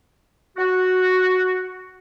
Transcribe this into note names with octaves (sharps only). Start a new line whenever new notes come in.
F#4